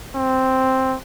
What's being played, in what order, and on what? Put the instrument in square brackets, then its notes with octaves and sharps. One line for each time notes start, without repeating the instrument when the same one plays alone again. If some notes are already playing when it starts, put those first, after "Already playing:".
[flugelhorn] C4